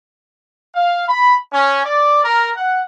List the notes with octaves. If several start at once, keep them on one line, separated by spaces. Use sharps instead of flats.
F5
B5
C#4
D5
A#4
F#5